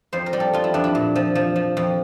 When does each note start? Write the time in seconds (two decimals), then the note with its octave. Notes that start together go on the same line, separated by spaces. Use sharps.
0.13 F2 C5
0.26 A#4
0.33 G3 G4
0.40 A4
0.53 F2 F4
0.64 E4
0.74 F2 D4
0.84 E4
0.95 A#2
1.16 F3
1.35 F3
1.56 F3
1.77 F2